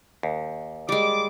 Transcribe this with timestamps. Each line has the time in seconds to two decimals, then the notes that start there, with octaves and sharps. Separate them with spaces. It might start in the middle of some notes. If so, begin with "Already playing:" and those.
0.23 D#2
0.89 G3 G#3 D6